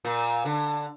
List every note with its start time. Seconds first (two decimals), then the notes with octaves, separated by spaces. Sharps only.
0.05 A#2
0.45 D3